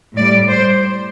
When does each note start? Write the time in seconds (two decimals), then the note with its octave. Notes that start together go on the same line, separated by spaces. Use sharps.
0.16 A2 G3 D5
0.49 C5